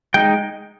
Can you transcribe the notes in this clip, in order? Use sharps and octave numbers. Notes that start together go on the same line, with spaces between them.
G#3 D#4 G5